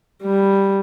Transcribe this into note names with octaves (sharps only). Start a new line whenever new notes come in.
G3